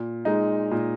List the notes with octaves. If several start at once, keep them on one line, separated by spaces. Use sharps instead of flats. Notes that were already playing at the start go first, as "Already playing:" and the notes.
Already playing: A#2
G#3 D#4
A#2